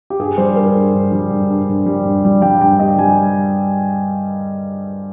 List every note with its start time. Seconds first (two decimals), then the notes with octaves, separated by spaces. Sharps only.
0.10 G4
0.19 G2 G#4
0.38 G3 C5
0.56 G2 A#4
0.75 G2 G#4
0.94 G2
1.12 G3
1.30 G2
1.50 G2
1.69 G2
1.86 G3
2.05 G2
2.24 G3
2.42 G3 G5
2.61 G2 G5
2.79 G3 D#5
2.98 G3 G#5